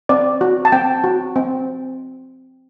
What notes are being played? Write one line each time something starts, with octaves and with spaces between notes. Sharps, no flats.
C4 D5
F#4
A5
C4 G5
F#4
C4